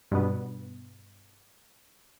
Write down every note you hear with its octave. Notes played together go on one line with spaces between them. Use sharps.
G2 B2 B3